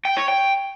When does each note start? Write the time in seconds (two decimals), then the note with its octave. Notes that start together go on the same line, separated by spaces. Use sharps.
0.05 G5
0.17 C#5
0.28 G5